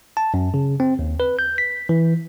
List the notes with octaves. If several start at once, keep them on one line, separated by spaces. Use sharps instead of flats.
A5
F#2
C#3
C4
D#2
B4
G6
B6
E3